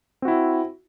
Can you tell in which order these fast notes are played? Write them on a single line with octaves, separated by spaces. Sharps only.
C4 F#4 E4